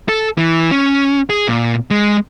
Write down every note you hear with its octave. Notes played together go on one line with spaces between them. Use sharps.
A4
E3
C#4
G#4
A#2
G#3